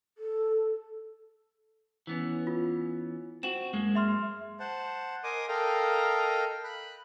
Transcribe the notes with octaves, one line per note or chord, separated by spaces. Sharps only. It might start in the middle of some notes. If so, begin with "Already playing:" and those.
A4
E3 B3 C#4
F4
C4 F#4 E7
F#2 G#3 A#3
E5 C6 F6
C5 F#5 A5
A#4 D#5 G#5 C6 D6 D#6
A4 A#4 D#5 F5 G5 A#5
B5 F#6